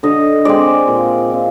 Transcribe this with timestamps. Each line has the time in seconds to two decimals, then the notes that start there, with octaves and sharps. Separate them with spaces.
0.03 D3 D#5
0.45 G#3 C4 D5
0.88 A#2
1.30 F3 C4